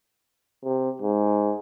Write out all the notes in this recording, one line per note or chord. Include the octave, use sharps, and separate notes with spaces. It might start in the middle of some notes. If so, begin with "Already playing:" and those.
C3
G#2